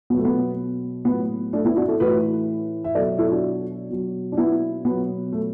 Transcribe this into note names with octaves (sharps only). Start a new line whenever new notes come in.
B2 F#3 B3
A3
B3
A2 F#3 B3
A3 D4
B3 E4
D4 F#4
E4 A4
A2 E3 F#4 B4
E5
B2 F#3 A4 D5
E4 A4
D4 F#4
B2 F#3
D4
B3 E4
B2 F#3 B3
A3